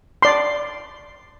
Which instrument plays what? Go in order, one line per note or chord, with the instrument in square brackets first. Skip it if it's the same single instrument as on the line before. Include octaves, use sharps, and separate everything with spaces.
[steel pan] D5 C6